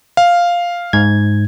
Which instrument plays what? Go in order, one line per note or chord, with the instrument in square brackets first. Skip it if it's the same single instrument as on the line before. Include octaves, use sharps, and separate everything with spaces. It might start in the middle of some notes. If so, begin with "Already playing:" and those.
[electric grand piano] F5
[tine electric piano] G#2 G#6